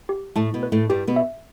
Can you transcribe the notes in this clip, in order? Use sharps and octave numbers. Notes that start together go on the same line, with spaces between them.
G4
A2 A3 A5
B2 B3
B4
A2 A3
G2 G3 G4
B2 B3
E5